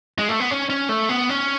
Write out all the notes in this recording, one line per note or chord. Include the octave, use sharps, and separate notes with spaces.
G#3
A3
B3
C#4
C#4
A3
B3
C#4